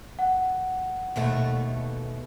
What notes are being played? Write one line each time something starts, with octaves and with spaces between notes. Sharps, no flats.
F#5
D#2 B2 A3